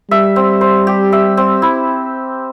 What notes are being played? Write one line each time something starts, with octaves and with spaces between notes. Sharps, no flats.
G3 E5
C4
C5
G4
E5
C4
E4